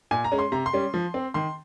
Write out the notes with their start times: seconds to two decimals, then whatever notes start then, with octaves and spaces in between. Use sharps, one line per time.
0.11 A#2 G#5
0.24 A#5
0.32 G#3 C#4
0.39 C6
0.52 C3 A#5
0.66 C6
0.73 G3 C#4
0.94 F3
1.14 C4
1.34 D#3 C6